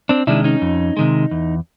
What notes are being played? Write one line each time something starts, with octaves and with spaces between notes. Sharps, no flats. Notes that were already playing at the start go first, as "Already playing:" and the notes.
C4 D4
C3 D#3 G#3 D4 E4
C#4 D#4
F2
C3 D#3 G#3
E2